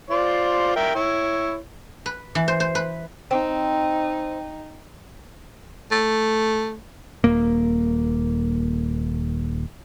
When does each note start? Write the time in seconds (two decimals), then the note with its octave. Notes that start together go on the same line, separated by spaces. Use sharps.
0.10 F4 C5 D5
0.76 A#4 E5 G5
0.95 E4 C#5
2.06 B4
2.35 E3
2.48 C5
2.60 C5
2.75 B4
3.31 C4 D#4
5.91 A3
7.24 D#1 A#3